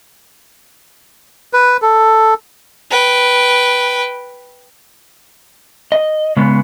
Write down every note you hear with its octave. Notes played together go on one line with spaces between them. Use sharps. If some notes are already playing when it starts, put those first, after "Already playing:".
B4
A4
B4 G5
D#5
C#3 G#3 B3